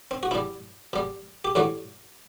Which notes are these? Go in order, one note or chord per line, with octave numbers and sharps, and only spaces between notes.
C4
F#4
B2 G3 E4
B2 G3
G4
A2 E3 G3 F#4